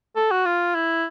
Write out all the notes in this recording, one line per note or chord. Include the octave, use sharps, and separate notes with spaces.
A4
F#4
F4
E4